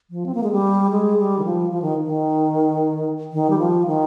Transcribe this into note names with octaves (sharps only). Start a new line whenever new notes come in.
F3
C4
A#3
G#3
G3
G#3
G3
D#3
F3
F3
D#3
D#3
D#3
G3
F3
D#3